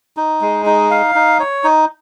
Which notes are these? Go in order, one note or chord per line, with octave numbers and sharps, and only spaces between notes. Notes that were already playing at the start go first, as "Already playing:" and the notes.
D#4
G#3
D#4
F5
D#4
C#5
D#4